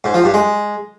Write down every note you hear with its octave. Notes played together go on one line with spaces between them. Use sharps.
G#2
F3
G2
G#3